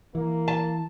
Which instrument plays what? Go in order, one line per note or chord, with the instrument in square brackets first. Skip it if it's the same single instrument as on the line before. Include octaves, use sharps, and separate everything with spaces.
[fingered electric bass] E3 [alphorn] A#3
[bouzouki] A5